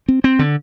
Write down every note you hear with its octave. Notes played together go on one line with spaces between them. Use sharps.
C4
C4
D3